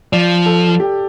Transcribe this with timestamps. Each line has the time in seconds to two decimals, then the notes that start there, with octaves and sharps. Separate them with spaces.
0.12 F3 D5
0.46 A4
0.80 G4